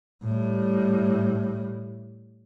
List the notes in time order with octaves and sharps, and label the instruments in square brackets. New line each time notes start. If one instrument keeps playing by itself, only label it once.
[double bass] A2 G3